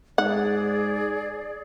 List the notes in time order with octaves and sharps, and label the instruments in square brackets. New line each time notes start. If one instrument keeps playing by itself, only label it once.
[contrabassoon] G#2 [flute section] G#4 D5 [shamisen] F#5